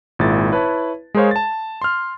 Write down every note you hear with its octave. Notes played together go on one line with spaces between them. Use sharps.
G#1 A#2 G#3 E4 A6
E4 B4 C#5 A5
G#3 G#4 A#4 C5 C#5 F5
A5 A6
C6 F6